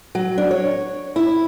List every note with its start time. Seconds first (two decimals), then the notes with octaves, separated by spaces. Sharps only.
0.15 F#3
0.38 D4
0.51 C#5
1.16 E4